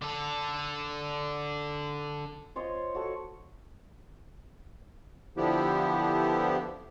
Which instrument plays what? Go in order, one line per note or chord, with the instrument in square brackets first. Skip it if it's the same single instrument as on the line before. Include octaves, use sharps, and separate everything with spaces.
[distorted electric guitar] D3 A4
[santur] F4 C5 C#5 D#5
F#4 A4 C#6
[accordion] D3 F3 B3 D4 E4 G4